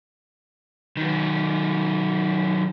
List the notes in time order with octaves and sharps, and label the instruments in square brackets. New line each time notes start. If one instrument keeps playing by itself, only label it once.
[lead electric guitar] D#3 F#3